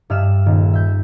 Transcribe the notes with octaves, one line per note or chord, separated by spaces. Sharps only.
G2 E5 F6 E7
D#1
E5 G6